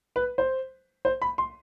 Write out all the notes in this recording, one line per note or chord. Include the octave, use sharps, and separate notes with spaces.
B4
C5
C5
B5
C6